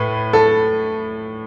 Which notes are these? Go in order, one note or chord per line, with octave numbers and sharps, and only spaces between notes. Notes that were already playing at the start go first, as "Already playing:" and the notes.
Already playing: A2 A3 B4
A4